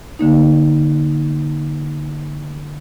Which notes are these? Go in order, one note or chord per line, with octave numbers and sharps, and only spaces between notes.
D3 A#3 D#4